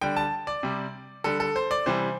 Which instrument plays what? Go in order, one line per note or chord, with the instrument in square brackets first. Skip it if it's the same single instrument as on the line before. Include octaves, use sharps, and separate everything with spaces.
[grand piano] D3 G3 G5
A5
D5
C3 G3
D3 G3 A4
A4
C5
D5
C3 E3 G3 C5